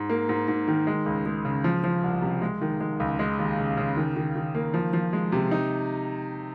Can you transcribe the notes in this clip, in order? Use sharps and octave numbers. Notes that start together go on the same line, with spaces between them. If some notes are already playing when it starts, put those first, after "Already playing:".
Already playing: G#2
A#3
G#2
G#2
D#3
G#3
C#2
G#3
C#3
F3
F3
C2
C3
G#3
D#3
G#3
C#2
G#3
D#2
C#3
C#3
D#3
D#3
D#3
A#3
F3
F3
G#3
C3
D#4